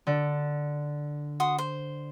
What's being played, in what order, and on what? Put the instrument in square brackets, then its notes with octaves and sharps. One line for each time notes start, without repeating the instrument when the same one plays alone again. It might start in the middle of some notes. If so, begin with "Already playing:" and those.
[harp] D3
[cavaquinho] F#4 C6 D#6
C5